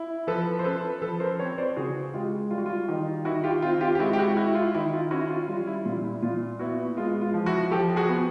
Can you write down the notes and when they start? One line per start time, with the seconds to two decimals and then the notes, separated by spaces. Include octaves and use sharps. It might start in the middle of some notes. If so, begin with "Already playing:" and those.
Already playing: E4
0.27 F3 A4 B4
0.59 C5
0.64 C#4 A4 B4
1.02 F3 A4 B4
1.20 A#4 C5
1.39 C4 B4 C#5
1.58 C5 D5
1.76 C#3 F#4 G#4
2.14 G#3 F4 G4
2.50 G3 F4
2.58 F#4
2.66 F4
2.88 D#3
3.25 D#3 E4 F#4
3.44 F4 G4
3.62 C4 F4
3.81 F4 G4
3.95 G4
4.00 G#3 E4 F#4
4.13 G4
4.18 E4 F#4
4.37 E4 F#4
4.55 F4
4.75 D#3 E4
4.93 F4
5.11 C#4 E4 F#4
5.29 F4
5.48 G3 F4
5.67 E4
5.85 A#2 F4
6.04 E4
6.22 A#2 F4
6.59 B3 E4 F#4
6.97 G#3 F4
7.21 F4
7.34 F3
7.46 E4 F#4
7.71 F3 G4 A4
7.96 F#4 G#4
8.09 B3